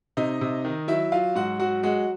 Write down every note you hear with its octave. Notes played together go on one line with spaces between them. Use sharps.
C3 D#4 D#5
C3
D#3
F#3 E4 E5
F#3 F4 F5
G#2 F#4 F#5
F#3 F#4 F#5
G#3 F#4 F#5